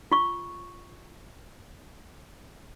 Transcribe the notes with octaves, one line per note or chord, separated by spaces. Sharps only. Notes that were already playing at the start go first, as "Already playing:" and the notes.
F4 C#6